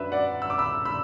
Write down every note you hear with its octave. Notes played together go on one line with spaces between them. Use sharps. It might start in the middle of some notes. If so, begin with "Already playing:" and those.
Already playing: F#2 F#3 D4 B4 E5
D5 F#5
E6
D6
B5 E6
B5 E6